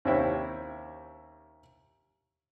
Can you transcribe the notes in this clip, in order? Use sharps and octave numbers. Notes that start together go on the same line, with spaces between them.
D#2 C3 C#4 E4 E5 G5